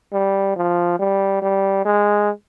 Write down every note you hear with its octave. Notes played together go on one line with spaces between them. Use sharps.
G3
F3
G3
G3
G#3